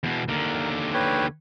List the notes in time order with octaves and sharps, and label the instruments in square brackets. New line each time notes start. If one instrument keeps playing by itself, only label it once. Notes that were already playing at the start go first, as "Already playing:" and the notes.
[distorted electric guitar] E2 B2
[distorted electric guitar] D#2 D3 [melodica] A#4
[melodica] B4 C#5 G5